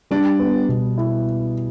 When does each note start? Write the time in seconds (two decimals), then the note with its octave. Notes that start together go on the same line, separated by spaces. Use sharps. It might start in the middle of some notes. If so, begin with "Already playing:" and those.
0.11 G3 D4
0.39 B3
0.69 B2
0.97 E4